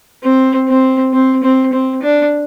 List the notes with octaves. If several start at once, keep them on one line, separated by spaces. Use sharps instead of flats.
C4
C4
C4
C4
C4
D4